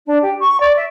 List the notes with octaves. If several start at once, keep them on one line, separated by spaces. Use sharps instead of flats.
D4
G4
C#6
D5
E5